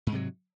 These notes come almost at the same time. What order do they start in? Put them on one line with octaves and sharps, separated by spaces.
G#2 G#3 C3 F#3